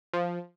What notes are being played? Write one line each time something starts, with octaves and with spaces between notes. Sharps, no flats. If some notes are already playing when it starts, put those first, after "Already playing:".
F3